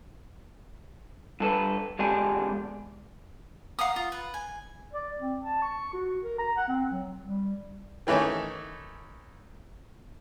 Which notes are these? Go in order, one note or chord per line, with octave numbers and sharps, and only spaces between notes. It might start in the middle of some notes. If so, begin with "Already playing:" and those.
G2 A4 B4
E2 D3 G#3 D4 G4 G#5
F5 F#5 A#5 D#6
F4
B4
G#5
D5
C4
A5
C#6
F#4
A#4
A#5
F#5
C4
F#3
G3
D#3 E3 A3 C#4 D#4